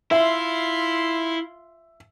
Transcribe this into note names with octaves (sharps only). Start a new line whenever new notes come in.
E4 F4 E5 C6